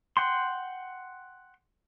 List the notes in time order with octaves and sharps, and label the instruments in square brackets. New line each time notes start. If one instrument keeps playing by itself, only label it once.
[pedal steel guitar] F#5 G5 C6